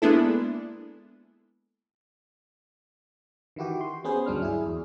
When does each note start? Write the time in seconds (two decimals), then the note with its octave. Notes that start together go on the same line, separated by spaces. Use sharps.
0.02 G#3 A#3 B3 D4 E4 A4
3.56 D#3 E3 E4 F#4 G4
3.81 C6
4.04 B3 C#4 G#4 B4 C5
4.26 D2 G2 F#3 D4 F6
4.42 E4 G#4
4.66 E2